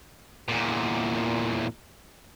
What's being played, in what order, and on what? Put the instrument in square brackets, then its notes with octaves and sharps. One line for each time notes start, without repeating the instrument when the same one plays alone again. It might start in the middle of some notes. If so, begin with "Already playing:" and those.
[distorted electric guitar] E2 A#2